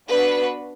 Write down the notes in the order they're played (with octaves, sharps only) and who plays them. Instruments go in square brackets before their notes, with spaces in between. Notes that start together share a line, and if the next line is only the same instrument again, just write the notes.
[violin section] B3 D4 F#4 B4